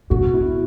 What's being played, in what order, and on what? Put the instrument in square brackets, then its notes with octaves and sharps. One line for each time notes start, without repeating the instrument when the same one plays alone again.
[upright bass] B2 [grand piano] F#4
[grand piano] E4